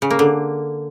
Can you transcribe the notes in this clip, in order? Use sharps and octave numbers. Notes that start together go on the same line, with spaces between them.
C#3
A#3
D3